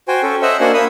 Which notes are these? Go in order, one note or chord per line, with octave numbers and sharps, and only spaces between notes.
F#4 C5 G5 G#5
C#4 A4
C5 D#5 E5 F#5 E6
A#3 D4 F#4 C5 F#5 G#5
A#3 B5 D#6 E6